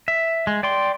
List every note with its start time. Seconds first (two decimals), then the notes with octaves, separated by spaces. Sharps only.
0.08 E5
0.47 G#3
0.63 D5 G5 C6